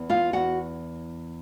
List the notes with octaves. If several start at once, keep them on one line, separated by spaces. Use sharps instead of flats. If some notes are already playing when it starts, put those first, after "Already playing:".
Already playing: E2 B3
F4 F5
E2 F#4 F#5